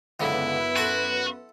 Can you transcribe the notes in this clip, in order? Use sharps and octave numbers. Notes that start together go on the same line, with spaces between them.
C#2 F#2 D3 B3 E4 B4
F#4 A4 F#5 C6